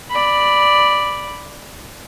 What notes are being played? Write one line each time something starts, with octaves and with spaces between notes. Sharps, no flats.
D5 B5